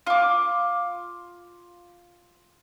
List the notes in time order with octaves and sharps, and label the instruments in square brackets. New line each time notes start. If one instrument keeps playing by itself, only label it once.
[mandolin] F4 D6